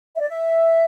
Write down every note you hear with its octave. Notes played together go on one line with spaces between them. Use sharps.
E5
D5
E5